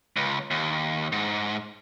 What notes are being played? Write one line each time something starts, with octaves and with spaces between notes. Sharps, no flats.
C#2
D#2
G#2